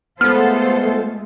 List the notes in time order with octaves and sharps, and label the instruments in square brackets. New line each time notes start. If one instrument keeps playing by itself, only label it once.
[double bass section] G#3 A3 [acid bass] B3 [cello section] F4 A4 C5 [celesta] F6